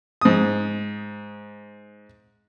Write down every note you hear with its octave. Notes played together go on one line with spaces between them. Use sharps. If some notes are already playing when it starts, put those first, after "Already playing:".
G#2 D#6